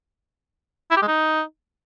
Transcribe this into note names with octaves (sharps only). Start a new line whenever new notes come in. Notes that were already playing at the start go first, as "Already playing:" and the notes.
E4
G4
G#3
D#4